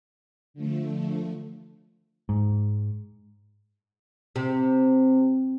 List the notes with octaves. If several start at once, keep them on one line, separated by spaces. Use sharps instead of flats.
D3 F3 A3
G#2
C3